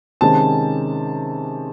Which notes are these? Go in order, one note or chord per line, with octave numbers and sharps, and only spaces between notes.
C3 D#3 G#3 C#4 A5